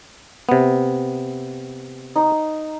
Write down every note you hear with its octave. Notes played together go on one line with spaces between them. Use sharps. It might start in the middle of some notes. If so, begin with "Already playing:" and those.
C3 B3
D#4